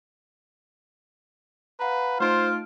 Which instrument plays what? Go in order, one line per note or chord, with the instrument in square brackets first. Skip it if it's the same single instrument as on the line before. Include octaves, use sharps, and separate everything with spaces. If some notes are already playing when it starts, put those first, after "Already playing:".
[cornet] B4 [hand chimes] F5 F#5 A#5
[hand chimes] A3 D#4 D7 [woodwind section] F4 [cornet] C5